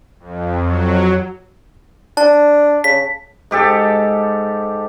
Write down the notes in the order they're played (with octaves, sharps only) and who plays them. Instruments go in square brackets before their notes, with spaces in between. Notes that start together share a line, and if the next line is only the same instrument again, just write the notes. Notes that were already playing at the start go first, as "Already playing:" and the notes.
[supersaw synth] F2
F#3
[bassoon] D4 [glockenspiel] A5
[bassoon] C#3 [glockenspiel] B6
[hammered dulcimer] G#2 G4 A4 A5